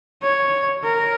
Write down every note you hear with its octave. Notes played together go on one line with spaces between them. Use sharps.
C#5
A#4